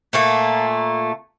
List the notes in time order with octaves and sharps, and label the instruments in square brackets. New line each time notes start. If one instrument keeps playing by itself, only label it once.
[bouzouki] A#2 A3 A#3